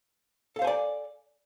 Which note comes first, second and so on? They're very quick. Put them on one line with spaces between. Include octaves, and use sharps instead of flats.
A4 F5 C5 G#5 D5